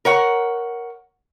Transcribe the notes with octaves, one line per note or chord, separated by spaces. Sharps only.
A#4 C#5 F#5